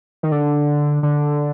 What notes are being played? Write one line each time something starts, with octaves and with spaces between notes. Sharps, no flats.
D#3
D3
D3